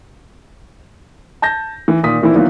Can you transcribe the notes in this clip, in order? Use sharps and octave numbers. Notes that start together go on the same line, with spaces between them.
A5 G6 A#6
E3
A#2 D#3 D#6 B6
A#2 D#3 E3 C4 E4
D#3 E3 F#3 A#3 B3 F4